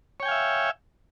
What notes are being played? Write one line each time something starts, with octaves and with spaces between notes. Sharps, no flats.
C#5 E5 F5 G5 G#5